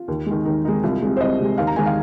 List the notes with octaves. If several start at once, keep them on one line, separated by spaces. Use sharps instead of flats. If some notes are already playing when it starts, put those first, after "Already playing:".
Already playing: F4
D#2
D#3 G#3
D#2 D#4
D#3 G#3 D#4
C2 F4
C3 G#3
C5
C2 D#5
C3 G#3
D#2 F5
A#5
D#3 G#3 G#5
F5